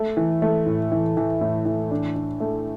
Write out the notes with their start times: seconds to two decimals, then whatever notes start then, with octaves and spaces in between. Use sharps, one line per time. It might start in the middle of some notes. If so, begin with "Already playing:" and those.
Already playing: A3
0.17 E3
0.42 A3
0.66 A2
0.92 E3
1.17 E3
1.41 A2
1.66 E3
1.91 D4
2.16 D4
2.40 A3